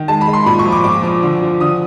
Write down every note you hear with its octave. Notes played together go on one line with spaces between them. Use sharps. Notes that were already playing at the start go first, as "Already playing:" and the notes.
Already playing: D#3
G#3 A5
B5
G#3
C6
A#2 B5
C#6
F3
D6
A#2 D6
F3
D3
F3
D3 D#6